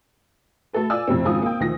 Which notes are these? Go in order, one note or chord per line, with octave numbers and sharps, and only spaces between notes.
A3 F#4 A4 B4
F4 D5 G#5 E6
F2 A2 C3 C4
G#1 G#2 C#3 F4 G#5 D#6
A#3 G5
D2 D#3 F3 A#6